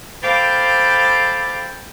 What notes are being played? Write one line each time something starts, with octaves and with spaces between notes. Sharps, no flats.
A4 C5 F5 G5 B5 D6